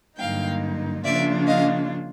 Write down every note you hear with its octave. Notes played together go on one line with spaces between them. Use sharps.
G2 D3 F#3 A#3 D#4 F5 G5
C#3 F3 A#3 D4 F4 D5 E5
D#5 F5